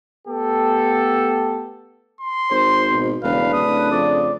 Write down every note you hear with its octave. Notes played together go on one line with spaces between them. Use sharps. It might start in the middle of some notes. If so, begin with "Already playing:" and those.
A3 B3 G4 A4
C6
G#1 C5
B2
E1 C#3 A3 D4 B4 F5
D1 D#6
F2 D5